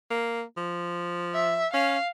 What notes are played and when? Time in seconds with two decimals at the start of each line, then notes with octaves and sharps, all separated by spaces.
0.10 A#3
0.57 F3
1.34 E5
1.73 C#4 F5